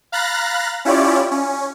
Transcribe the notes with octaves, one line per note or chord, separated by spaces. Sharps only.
F5 A#5 B5 F#6 A6 A#6
C#4 E4 F4 G4 C#5 D5
C#4